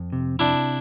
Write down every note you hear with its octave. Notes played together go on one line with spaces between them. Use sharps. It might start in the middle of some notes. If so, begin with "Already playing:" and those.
Already playing: F2
C3
C3 D4 E4